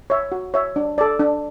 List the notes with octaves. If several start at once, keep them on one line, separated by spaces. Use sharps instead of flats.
C#5 E5
F#4
C#5 E5
D4
A4 D5
D4